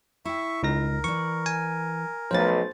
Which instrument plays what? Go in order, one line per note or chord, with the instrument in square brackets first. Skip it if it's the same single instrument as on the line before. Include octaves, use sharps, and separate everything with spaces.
[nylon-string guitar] E4 G5 [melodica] E5 C#6
[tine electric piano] C#2 D#4 A#6 [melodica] A#4
[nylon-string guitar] E3 D5 [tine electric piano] C#6
[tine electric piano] G#5
[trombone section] B1 [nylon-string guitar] F3 A3 B4 [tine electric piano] C5 A6